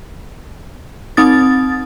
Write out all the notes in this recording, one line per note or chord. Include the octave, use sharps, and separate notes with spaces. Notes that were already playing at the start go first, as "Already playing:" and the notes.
C4 D#4 D#6 A6